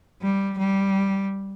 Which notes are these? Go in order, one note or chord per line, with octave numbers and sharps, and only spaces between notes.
G3
G3